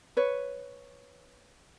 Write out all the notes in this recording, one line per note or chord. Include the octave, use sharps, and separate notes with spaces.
B4 C#5